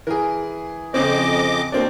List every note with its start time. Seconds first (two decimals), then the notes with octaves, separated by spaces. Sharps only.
0.07 E3 G#4 A#4
0.94 F2 C#3 C4 D#5 D6
1.72 B2 A#3 C4 D4